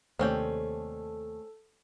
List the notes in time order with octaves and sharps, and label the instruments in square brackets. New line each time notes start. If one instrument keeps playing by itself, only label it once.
[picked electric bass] D#2 C3 [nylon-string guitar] A3 D5 [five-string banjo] C4 C#4 G5 [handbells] A4